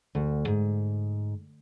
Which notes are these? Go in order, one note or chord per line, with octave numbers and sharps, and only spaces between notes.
D2
G#2